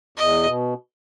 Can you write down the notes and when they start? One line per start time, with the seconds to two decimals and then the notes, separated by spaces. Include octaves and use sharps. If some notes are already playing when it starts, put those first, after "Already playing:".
0.17 E2 D#5
0.45 B2